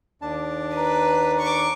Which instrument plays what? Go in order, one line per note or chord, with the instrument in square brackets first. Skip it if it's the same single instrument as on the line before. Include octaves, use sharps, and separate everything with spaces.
[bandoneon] D#2 D4 A5
[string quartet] B4 [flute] A#5
[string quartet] C#6 D6